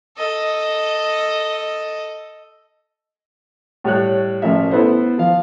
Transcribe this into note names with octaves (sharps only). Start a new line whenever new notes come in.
A4 D#5
A2 G3 C#5 F#6
A1 F3 A#4 E5
B3 E4 A4 B4 C5
F3 F5